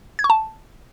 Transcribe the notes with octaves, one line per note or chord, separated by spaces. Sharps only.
G#6
C#6
A5